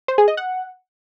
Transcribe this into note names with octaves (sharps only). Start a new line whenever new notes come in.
C5
G#4
D#5
F#5